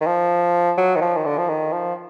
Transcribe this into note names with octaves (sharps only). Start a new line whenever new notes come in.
D#3
F3
F#3
D#3
F3
D#3
D3
F3
D#3
F3